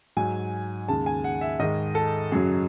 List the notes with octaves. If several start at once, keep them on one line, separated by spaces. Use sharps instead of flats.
G#2 F#3 G#5
D#2 C#3 G#3 A5
G#5
F#5
E5
G#2 D#3 G#3 D#5
A4
F#2 C#3 F#3 G#4